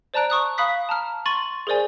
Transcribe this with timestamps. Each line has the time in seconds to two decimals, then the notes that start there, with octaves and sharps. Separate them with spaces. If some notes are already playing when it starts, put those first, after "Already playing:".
0.14 C5 D5 A5 A#5 F#6 D7
0.30 C#6 D#6 F#6
0.58 F5 B5 D#6 F#6 B6
0.89 A5 A#5 F6
1.26 C6 C#6 A6 D#7 F#7
1.67 G#4 A#4 C5 D5 G#5